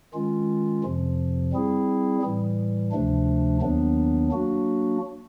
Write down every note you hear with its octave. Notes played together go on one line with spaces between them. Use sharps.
D#3 G#3 C#4 F4
F2 C3 F3
G3 C4 E4 G#4
A2 E3 G3
D2 C3 F3 A3 D4
D#2 D#3 F#3 B3 D4
F#3 A#3 D4 F#4